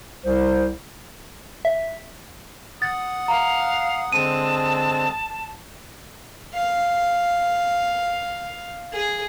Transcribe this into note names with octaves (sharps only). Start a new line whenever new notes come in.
C2 C5
E5
F#5 D#6 A6
F5 A#5
D3 G#3 C4 A5 D#7
F5
G#4